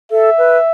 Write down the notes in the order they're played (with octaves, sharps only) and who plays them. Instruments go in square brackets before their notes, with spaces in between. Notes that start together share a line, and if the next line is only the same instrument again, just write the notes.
[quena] A4 [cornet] E5
[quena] B4